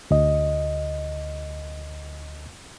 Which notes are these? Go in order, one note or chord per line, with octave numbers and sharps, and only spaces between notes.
D2 D#5